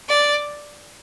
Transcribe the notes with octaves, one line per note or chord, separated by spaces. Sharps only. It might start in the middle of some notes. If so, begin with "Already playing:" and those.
D5